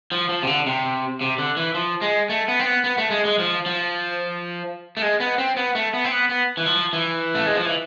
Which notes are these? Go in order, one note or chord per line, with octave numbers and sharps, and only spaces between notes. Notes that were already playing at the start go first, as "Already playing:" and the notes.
F3
F3
C3
D3
C3
C3
D3
E3
F3
G#3
A3
B3
C4
B3
B3
A3
G#3
G#3
F3
F3
A3
G#3
B3
C4
B3
A3
B3
C4
B3
B3
E3
F3
E3
A3
G#3
F3
E3